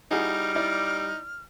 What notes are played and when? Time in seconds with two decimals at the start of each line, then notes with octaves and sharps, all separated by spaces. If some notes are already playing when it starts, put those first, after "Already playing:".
0.11 G3 D#4 E4 F#4 G#4 F6
0.55 D#4 E4 D5